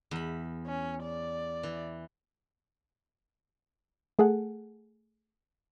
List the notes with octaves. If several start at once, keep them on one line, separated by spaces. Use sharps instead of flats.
E2 B5
C#4
D5
E3
A3 G#4 A4 F#5